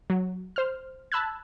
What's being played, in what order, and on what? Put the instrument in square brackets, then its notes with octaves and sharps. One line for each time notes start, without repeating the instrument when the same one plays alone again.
[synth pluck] F#3
C5 F6
A5 B5 E6 F#6 G#6